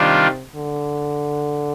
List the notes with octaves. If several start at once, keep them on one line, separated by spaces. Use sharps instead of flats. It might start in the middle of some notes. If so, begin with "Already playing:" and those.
Already playing: C3 D#3 G3 D4 F4
D3